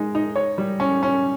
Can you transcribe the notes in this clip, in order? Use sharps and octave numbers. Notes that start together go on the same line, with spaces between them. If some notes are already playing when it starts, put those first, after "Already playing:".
Already playing: G#3 D#4
D#4
C#5
G3
C#4
C#4